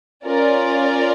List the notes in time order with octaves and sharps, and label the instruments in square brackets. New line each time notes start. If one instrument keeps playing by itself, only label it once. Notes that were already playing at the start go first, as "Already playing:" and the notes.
[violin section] C#4 F4 A#4 D5